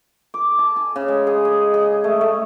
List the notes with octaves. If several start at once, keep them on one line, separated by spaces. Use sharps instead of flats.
D6
A5
G#5
C#3
G#3
G#4
D#5
G#4
A3
A3